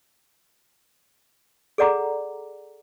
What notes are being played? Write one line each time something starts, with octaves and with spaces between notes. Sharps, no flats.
G#4 A4 D5 F#5 A#5 D6